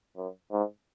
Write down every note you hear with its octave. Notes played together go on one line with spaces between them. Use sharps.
F#2
G#2